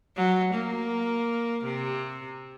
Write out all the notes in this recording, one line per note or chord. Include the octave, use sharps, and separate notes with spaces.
F#3
A#3
C3